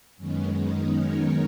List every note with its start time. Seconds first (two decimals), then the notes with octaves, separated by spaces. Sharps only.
0.17 F#2 D#3 G#3 B3 C#4
0.57 D#4
0.95 A#4 C#5